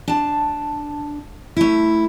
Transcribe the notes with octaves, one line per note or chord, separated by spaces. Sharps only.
D4 A5
A3 E4